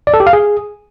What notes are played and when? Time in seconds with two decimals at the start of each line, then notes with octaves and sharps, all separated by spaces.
0.07 D5
0.14 A4
0.20 G4
0.27 F5
0.33 G#4